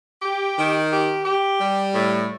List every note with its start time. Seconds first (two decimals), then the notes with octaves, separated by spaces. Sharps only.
0.22 G4
0.57 D#3
0.91 G4
1.25 G4
1.60 G3
1.93 A2